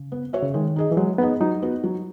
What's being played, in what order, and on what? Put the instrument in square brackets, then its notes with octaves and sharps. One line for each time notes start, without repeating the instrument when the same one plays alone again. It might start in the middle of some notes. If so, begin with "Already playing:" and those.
Already playing: [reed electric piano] C#3
[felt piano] B3
F#4 C#5 E5
[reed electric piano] C#3
[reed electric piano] D#3 [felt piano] G#3
[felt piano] D#4 G#4 D#5
[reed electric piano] E3
[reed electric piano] F#3 [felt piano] G#3
[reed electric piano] B3 [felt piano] D#4 G#4 D#5
[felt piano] F#3 [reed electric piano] D#4
[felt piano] B3 F#4
F#3